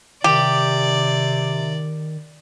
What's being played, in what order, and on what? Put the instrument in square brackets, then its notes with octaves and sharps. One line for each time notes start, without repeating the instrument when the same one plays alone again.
[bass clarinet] C3 [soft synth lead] D#3 [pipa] G4 [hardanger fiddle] D5